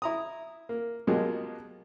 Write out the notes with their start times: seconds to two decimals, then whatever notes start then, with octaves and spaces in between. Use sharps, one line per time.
0.02 E4 A#5 D#6
0.69 A#3
1.07 B2 F#3 G#3 A#3 F4 G4